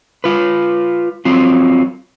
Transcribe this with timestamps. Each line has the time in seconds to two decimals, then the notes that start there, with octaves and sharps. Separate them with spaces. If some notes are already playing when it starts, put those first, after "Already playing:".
0.24 F4 B4
1.25 F#3 C4 F4